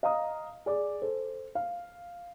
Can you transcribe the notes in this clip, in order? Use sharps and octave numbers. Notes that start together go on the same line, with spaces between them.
D#5 F5 A#5 D#6
G#4 D5 D6
A4 C5
F5